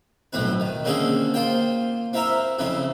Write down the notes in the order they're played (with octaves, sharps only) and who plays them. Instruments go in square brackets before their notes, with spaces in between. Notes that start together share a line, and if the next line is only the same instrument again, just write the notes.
[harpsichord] B1 F2 A2 C4 B4
D#3
D3 A#3 C4 C#4 G#4 A4
A#3 F4 C5 G5
C4 E4 A#4 E5 A#5
F2 C#3 C4 E4